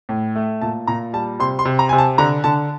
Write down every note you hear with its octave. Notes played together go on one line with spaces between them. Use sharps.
A2
A3
A#2 A5
A#2 A#5
G3 A5
C3 C6
C6
C3
A#5
C3 G#5
A5
D3 A#5
D3 A5